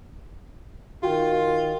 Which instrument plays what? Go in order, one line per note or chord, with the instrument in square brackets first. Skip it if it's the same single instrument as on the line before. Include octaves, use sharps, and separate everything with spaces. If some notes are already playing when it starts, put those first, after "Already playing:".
[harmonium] D#3 [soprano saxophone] F4 [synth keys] F#4 G5